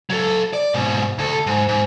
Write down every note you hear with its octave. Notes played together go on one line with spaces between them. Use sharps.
F#3 A4
D5
G#2 B2
D2 A4
G#2
G#2